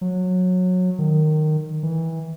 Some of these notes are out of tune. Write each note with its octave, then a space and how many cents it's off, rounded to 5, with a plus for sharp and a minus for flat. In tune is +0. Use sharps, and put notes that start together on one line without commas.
F#3 -20
D#3 -15
E3 -20